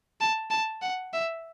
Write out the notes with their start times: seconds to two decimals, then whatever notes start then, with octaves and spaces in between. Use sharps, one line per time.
0.21 A5
0.51 A5
0.82 F#5
1.13 E5